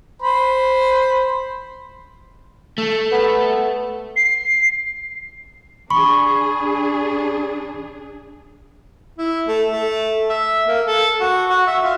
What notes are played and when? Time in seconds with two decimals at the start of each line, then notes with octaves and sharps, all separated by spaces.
0.22 C5 B5
2.78 A3
3.12 B3
4.16 C7
5.90 D4 G#4 B5 C#6
9.18 E4
9.48 A3
9.70 A3
10.30 E5
10.68 A#3
10.87 A4
11.20 F#4
11.50 F#4
11.67 E5
11.84 F4